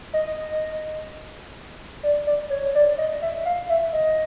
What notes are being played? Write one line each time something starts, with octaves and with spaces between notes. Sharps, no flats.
D#5
D5
D5
C#5
D5
D#5
E5
F5
E5
D#5